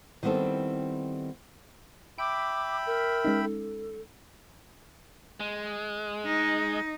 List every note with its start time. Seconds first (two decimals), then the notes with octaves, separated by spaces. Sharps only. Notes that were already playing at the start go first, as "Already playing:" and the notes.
0.23 D#3 G3 B3 C4 E4 A4
2.18 E5 G5 B5 D6 D7
2.86 A#4
3.25 G#3 C#4 D#4
3.43 A4
5.40 G#3
6.26 D#4